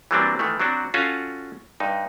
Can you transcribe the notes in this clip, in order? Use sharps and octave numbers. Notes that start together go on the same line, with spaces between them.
E3 F#3 G3 A#3 C4 D4
D#3 E3 A3
F#3 C4 D4 F#4
C#4 F4 F#4 A4 F5 G#5
G2 D#4